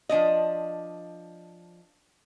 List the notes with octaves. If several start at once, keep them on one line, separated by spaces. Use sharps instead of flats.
F3 D4 D5 D#5